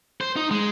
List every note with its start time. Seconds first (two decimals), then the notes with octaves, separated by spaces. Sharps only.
0.21 C5
0.36 D#4
0.51 G#3